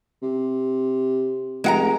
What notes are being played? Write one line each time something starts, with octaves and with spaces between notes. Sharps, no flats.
C3
F1 G#3 F#5 A#5